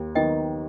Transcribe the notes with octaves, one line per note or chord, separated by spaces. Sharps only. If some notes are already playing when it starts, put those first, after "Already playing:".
Already playing: D#2
D#3 B3 D#4 D#5 G5